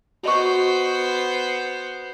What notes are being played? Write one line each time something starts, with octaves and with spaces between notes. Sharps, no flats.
B3 F#4 C5 D#5 C#6